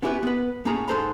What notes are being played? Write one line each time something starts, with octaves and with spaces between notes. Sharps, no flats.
B3 C#4 E4 G4 A4 B4
B3 B4
A2 A#3 C#4 G#4 A#5 B5
G#2 D#3 A4 C5 A#5 B5